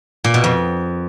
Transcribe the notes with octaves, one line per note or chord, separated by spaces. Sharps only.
A#2
B2
F2